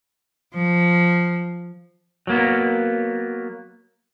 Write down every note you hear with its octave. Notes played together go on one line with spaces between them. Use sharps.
F3
F#3 A#3 B3